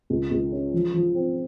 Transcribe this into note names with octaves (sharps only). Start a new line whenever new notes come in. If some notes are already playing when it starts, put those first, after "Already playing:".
C#2
C#2
C#4
F3
F3
C4